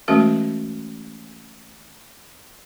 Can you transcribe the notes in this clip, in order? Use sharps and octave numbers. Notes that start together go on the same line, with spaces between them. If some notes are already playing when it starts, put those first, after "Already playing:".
E3 G#3 A3 C#4 F#4 A#4